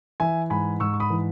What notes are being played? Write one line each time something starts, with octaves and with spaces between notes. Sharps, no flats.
E3 E5 G#5
G#2 G#5 B5
G#2 C#6 E6
C#6
B5 D#6
E3